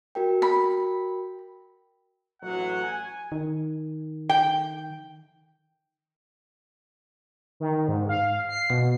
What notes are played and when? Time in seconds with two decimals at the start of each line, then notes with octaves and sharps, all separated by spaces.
0.15 F#4 A#4 G5
0.42 B5
2.42 A1 F#3 F#5
2.84 G#5
3.32 D#3
4.29 G5
7.60 D#3
7.88 G#2
8.09 F5
8.49 C7
8.70 B2